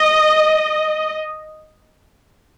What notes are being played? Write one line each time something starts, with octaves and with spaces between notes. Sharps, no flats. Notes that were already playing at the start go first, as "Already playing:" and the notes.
Already playing: D#5